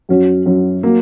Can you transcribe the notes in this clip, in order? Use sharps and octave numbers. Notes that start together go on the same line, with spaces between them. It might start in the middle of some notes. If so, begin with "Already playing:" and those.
F#2 F#3 C#4 F#4
F#2 F#3 C#4 F#4
F#3 A#3